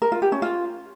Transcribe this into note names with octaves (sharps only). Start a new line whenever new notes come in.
A#4
F4
G4
C#4
F4